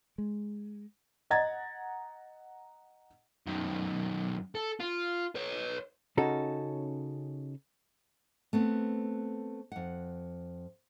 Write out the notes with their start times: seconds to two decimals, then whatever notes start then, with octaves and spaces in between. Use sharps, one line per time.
0.18 G#3
1.30 D#5 F#5 A#5 G#6 A6
3.47 F#2 D#3
4.55 A4
4.80 F4
5.35 B4 C#5
6.17 C#3 C#4 D#4 F#4 A4
8.53 A3 B3 C4
9.72 F2 F#5